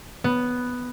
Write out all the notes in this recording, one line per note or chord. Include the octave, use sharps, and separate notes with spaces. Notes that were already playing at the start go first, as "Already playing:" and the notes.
B3